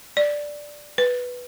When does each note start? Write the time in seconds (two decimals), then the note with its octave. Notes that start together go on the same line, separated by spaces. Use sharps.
0.17 D5
0.98 B4